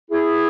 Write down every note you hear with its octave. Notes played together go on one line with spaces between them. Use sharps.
E4 G#4